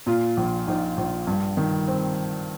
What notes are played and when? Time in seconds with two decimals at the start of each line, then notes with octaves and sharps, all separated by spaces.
0.06 A#2 F4
0.37 A#1
0.67 A#1 D#4
0.97 A#1
1.27 G2
1.57 D#3
1.88 C4